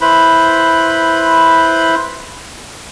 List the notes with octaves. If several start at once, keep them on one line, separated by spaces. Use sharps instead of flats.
E4 B4 C5 B5